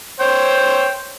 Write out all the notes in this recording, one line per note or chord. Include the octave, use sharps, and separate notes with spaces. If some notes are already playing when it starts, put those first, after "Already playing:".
C5 C#5 G5